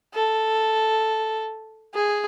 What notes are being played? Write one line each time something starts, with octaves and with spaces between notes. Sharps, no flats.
A4
G#4